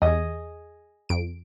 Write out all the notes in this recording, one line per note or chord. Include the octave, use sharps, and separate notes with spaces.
E2 G#4 D#5
F2 D7